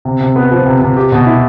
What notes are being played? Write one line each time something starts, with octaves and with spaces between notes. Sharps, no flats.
C3
C3
B3
F3
C3
C3
G4
B2
E4